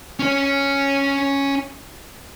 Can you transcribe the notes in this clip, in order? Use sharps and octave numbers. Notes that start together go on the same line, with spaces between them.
C#4 C#5